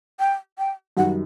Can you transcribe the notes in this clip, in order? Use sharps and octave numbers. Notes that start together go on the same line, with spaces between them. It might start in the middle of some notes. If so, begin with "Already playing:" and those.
G5
G5
F#2 D#3 G3 F#5